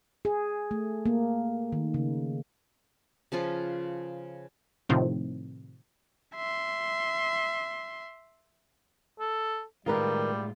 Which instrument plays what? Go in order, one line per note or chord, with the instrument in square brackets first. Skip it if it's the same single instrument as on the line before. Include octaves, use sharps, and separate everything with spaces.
[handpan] G#4
A3
A#3
D#3
C#3
[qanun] C#3 F3 F4 B4
[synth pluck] A2 C3 D#3 F3
[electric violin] E5 C6
[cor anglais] A4
[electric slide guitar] A2 G#3 F4 [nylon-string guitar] D#3 A#4 B4 [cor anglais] G3